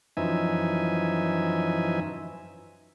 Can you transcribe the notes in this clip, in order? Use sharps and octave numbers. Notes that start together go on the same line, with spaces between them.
F#2 E3 F3 D#4 E5 G#5